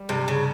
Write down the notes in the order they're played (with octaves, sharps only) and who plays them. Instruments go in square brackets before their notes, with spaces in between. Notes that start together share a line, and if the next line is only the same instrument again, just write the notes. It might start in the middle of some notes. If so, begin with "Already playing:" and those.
Already playing: [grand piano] G3
[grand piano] G2 [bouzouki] C3
[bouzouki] C#3